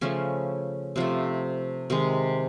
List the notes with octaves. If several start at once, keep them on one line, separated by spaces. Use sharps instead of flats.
C#3 F3 A3 C#4
C3 F3 A3
C3 D#3 G#3